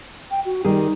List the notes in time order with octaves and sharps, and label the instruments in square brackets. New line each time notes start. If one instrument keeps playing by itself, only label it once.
[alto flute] G5
F#4
[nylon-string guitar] D#3 G3 G#4 [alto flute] D#4